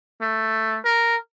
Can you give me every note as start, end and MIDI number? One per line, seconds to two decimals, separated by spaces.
0.21 0.78 57
0.85 1.16 70